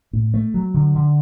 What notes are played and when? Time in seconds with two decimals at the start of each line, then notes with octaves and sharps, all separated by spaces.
0.13 A2
0.34 A3
0.54 F#3
0.74 D3
0.95 D3